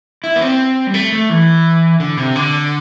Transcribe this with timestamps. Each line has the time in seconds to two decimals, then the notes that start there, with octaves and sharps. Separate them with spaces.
0.24 E4
0.36 B3
0.41 C4
0.87 G3
0.94 A3
1.12 A3
1.30 E3
2.00 D3
2.17 C3
2.36 D3